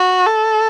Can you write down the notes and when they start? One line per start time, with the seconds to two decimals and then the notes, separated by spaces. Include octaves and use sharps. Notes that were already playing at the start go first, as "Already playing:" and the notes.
Already playing: F#4
0.26 A4